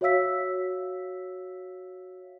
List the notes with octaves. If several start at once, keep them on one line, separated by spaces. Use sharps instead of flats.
F#4 C#5 E5 F5 E6 B6